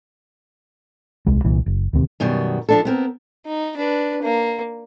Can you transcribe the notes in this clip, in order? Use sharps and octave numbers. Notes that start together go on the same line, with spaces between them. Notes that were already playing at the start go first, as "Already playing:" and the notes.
D#1 C2 G#3
C2 A#2 E3
F#1
D1 D#2 C3
F#2 B2 D#3 G3
F3 D4 A4
B3 C4 A#4
D#4
D4 B4
A#3